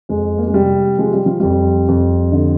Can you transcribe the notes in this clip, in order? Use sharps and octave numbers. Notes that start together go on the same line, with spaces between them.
F2 G#3
A#3
G#3
C3 G3
F3 G#3
G3
F3
F2 G3
F2
D3